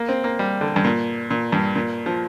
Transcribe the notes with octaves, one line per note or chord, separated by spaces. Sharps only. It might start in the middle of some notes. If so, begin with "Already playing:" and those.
Already playing: A#3
C4
A#3
G3
D3
G2
A#2
A#2
G2
A#2
F3